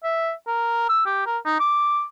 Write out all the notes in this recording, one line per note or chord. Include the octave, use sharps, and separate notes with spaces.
E5
A#4
E6
G4
A#4
D#4
D6